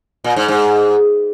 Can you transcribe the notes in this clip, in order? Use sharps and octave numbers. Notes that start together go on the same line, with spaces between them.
A#2
G#2
G#2